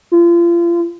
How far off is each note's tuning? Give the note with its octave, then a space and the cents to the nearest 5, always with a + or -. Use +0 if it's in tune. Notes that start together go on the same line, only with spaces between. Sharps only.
F4 -35